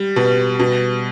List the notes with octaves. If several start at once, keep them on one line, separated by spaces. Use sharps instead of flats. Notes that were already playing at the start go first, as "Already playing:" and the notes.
Already playing: G3
B2
B2